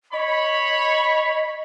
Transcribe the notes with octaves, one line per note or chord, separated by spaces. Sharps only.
C#5 D#5 B5